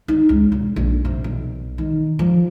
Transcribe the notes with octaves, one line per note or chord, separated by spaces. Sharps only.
D#4
C#2
E1
A#1
C3
B1
D#3
F3